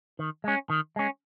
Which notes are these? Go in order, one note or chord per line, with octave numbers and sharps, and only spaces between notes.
D#3
G#3 C#4
D#3
G#3 C#4